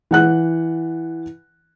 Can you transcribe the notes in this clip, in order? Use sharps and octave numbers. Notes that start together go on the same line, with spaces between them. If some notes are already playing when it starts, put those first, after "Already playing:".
E3 F#5 F#6